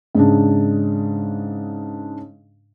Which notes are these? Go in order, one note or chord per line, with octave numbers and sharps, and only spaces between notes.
G#2 C#3 D4